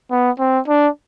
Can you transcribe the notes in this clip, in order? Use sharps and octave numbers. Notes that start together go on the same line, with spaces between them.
B3
C4
D4